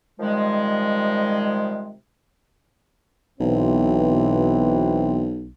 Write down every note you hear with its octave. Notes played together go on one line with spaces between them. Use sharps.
C3 D#3 F3 G3 G#3
B1 B2 E3 C4